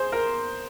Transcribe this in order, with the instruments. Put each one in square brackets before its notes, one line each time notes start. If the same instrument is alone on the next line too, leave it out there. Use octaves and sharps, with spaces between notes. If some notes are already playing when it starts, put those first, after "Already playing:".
Already playing: [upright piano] G#4 C5
A#4